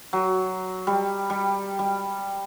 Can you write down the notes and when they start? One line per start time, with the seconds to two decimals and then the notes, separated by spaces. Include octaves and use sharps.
0.13 F#3
0.87 G3
1.30 G3
1.79 G3